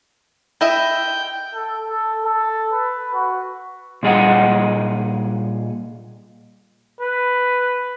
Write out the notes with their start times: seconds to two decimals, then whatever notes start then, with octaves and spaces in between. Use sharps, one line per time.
0.61 E4 D#5 E5 G5
1.55 A4
1.89 A4
2.24 A4
2.73 B4
3.14 F#4
4.03 A#2 G3 G#4 D#5 F#5
7.00 B4